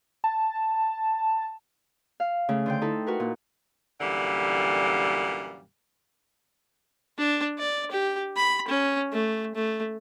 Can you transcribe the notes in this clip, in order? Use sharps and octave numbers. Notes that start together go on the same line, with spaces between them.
A5
F5
C#3 A3
D3 C5 G5
D#4 E4 A4
F#4 A#4 B4
A#2
F#2 A#2 D3 E3 G3
D4
D5
G4
B5
C#4
A3
A3